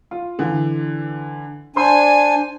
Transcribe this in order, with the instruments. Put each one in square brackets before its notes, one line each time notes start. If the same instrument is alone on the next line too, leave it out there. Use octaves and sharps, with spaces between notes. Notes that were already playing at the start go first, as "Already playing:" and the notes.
[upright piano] F4
D3 E3
[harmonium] D4 G#5 [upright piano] C5 C6